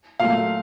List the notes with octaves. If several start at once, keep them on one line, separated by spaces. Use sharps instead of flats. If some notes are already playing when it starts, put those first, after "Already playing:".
A#2 F#3 A3 F5